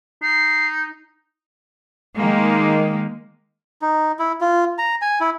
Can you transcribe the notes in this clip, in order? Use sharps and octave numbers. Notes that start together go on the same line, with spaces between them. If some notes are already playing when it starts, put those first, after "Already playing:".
D#4 C7
D#3 G#3 A#3
D#4
E4
F4
A#5
G#5
E4